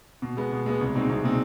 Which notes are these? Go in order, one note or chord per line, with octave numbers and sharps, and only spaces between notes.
B2
G#3 B3
B2
G#3 B3
C2
B2 G#3 C4 D#4
C2
B2 G#3 C4 D#4